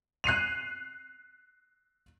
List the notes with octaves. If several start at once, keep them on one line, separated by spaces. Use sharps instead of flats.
F#6 C7 D#7 F7